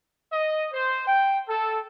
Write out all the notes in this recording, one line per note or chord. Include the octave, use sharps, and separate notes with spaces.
D#5
C5
G5
A4